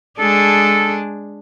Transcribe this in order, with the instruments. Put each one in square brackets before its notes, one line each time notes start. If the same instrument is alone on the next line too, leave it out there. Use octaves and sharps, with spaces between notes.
[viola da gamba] G#3 D4 G#4 [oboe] A4